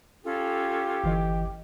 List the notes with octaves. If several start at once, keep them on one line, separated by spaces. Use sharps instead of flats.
C#4 F4 G4 A4
G1 E3 D#5